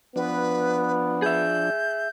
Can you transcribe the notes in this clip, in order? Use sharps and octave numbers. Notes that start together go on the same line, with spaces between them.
F3 B3 D4 B4
G#4 E5 G6